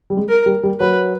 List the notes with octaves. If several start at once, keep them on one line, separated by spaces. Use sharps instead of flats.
G3
G#3
A#4
G3
G3
F#3 B4